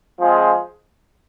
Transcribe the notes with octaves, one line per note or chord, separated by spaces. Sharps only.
F3 G#3 C4 F4 G#4